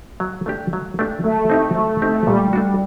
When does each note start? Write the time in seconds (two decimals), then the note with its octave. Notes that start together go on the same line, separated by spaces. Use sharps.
0.20 F#3
0.46 A3 D4 G4
0.73 F#3
0.99 A3 D4 G4
1.24 F#3 A3
1.50 C4 D#4 G4
1.76 F#3
2.02 C4 D#4 G4
2.27 A#2 G3
2.53 A3 D4 F#4